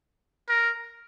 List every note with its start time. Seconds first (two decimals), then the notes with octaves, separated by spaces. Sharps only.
0.49 A#4